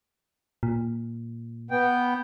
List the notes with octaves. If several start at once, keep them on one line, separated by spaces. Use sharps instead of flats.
A#2
B3 G5